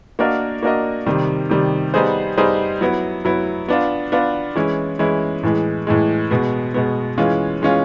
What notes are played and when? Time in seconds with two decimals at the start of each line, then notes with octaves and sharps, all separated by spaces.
0.19 A#3 D4 F#4 A#4 D#5
0.63 A#3 D4 F#4 A#4 D#5
1.06 C3 D#3 G3
1.50 C3 D#3 G3
1.94 G3 B3 D#4 G#4 C5
2.38 G3 B3 D#4 G#4 C5
2.81 F#3 B3 E4
3.25 F#3 B3 E4
3.68 B3 D4 F4
4.12 B3 D4 F4
4.55 E3 G#3 C#4 E4
4.99 E3 G#3 C#4 E4
5.43 A2 E3 G#3
5.87 A2 E3 G#3
6.31 B2 G#3 B3
6.74 B2 G#3 B3
7.18 E3 G#3 C#4 F4
7.62 E3 G#3 C#4 F4